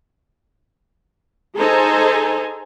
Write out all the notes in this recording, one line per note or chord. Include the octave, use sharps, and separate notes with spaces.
D#4 G#4 A4 C5 G#5 A#5